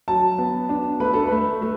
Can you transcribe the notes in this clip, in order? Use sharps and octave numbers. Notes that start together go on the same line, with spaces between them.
F#3 A5
B3
D4
A3 B4
A4
A3 B4
A3